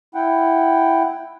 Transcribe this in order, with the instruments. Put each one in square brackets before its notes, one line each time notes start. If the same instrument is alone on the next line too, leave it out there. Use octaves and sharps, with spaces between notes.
[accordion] E4 F#5 G5